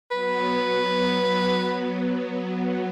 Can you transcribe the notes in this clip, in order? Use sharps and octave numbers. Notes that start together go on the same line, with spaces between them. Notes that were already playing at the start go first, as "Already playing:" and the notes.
F#3 B3 B4